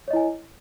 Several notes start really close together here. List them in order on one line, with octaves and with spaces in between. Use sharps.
C#5 D#5 E4 G#5